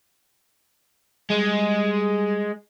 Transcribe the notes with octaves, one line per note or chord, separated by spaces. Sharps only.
G3 G#3